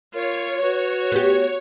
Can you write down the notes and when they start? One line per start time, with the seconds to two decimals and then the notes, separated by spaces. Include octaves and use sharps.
0.14 F4 A#4 C#5
0.62 F#4 B4
1.12 B3 G4